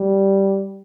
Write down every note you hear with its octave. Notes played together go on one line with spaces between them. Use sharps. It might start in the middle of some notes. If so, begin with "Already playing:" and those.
Already playing: G3